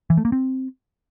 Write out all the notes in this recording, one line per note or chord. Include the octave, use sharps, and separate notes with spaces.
E3
A3
A#3
C4